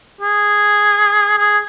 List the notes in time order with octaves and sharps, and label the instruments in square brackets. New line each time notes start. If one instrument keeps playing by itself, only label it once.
[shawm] G#4
G#4